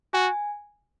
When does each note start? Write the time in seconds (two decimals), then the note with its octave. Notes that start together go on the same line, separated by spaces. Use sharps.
0.14 F#4 G#5